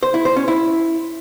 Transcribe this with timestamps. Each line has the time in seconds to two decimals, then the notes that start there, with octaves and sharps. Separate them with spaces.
0.03 C5
0.14 E4
0.25 C5
0.36 C#4
0.48 E4